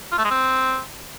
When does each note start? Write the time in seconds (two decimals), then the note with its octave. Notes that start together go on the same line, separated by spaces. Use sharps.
0.12 F4
0.18 A3
0.24 G#3
0.31 C4